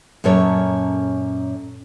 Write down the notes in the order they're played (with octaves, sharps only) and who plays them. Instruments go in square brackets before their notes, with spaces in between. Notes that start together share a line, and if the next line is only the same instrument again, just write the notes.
[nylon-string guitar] F#2 A#2 C#4 A4 C#5